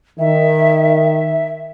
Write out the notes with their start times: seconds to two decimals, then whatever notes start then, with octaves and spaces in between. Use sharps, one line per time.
0.19 D#3 E5